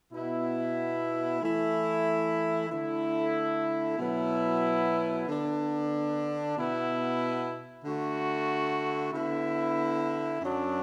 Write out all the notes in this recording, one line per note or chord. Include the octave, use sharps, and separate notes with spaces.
B2 B3 E4
E3 A3 E4
D3 A3 E4
B2 F#3 B3 E4
D3 B3 D4
B2 B3 E4
D3 A3 F#4
D3 B3 E4
F#2 F#3 D4